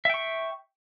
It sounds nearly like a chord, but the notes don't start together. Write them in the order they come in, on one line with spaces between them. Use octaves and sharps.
E5 G5 C#6